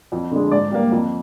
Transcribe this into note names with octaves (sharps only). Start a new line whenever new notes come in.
F2
D3 G#3
G#2 D5
G3 A#3
F2